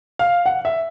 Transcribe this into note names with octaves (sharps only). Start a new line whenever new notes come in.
F5
F#5
E5